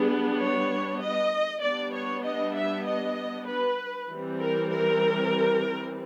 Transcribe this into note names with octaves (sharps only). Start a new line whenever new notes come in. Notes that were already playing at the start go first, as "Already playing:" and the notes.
Already playing: G3 B3 D4 G#4
C#5
D#5
G3 B3 D4 D5
C#5
D#5
E5
D#5
B4
E3 G3 C4
A#4
A#4